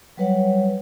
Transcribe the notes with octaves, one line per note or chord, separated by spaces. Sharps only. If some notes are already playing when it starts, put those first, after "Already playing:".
F#3 G3 B4 C#5 F#5